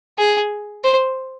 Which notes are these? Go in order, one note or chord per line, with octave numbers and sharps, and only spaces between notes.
G#4
C5